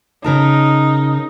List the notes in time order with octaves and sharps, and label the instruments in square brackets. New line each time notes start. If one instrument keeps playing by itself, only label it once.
[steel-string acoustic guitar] C#3 A#4 A5 [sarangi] D#4